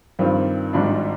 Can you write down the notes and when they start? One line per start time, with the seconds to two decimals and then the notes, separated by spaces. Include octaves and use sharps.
0.19 G2 D#3 G3 C4 F4
0.73 G#1 G#2 G3 D4 F4